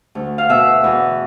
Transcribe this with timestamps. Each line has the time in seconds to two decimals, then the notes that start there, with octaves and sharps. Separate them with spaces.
0.15 D2
0.38 F5
0.49 B2 E5
0.84 E2